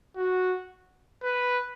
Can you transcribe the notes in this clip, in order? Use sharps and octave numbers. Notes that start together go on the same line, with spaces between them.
F#4
B4